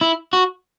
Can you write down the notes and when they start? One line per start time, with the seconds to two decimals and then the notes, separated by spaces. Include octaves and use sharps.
0.01 E4
0.33 F#4